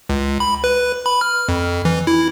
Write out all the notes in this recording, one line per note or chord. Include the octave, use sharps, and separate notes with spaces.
C#2
B5
B4
B5
F6
F2
E3
E4